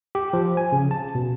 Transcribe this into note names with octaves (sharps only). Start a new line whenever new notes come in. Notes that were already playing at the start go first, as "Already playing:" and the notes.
G4
F3
G#5
C#3
A5
B2